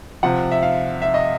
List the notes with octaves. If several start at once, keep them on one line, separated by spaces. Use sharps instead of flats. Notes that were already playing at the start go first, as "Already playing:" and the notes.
C3 F3 F#5
E5
F5
E5
D#5